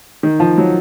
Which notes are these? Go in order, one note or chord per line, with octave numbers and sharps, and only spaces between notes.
D#3
F3
F#3